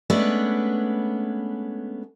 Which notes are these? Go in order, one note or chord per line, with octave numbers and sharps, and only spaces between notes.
G#3 A3 B3 C#4 D4 B4